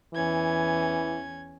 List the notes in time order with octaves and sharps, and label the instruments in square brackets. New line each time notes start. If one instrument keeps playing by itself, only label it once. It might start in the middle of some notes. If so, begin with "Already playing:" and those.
[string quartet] E2 C#4 G#6 [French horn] E3